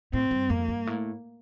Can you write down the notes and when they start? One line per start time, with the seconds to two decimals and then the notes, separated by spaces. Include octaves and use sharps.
0.13 A2 C4
0.31 G2
0.50 F2 A#3
0.68 G2
0.87 A2